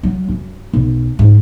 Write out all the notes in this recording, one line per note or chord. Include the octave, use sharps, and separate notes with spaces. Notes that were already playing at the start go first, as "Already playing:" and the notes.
F#3
F#2
B1
G#2